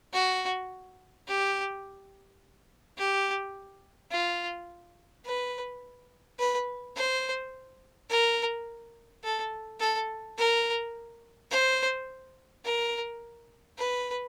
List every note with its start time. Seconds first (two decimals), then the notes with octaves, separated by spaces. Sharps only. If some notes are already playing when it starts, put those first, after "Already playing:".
0.13 F#4
1.28 G4
2.98 G4
4.11 F4
5.25 B4
6.39 B4
6.96 C5
8.09 A#4
9.24 A4
9.80 A4
10.38 A#4
11.51 C5
12.65 A#4
13.78 B4